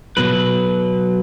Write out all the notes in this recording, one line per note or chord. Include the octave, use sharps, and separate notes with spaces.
B1 B2 F#3 B4